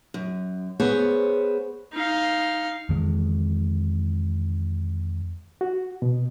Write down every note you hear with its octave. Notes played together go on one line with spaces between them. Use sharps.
F#2
B3 G#4 C5 C#5
D#4 F5
F2 D#3 E3 G#3
F#4
B2